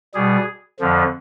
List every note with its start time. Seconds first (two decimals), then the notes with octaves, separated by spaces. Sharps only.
0.14 B2 G3 G#4
0.79 F2 D3 F3